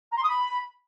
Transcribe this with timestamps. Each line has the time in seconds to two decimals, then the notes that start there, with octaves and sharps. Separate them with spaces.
0.11 A#5
0.17 C6
0.23 D#6
0.29 B5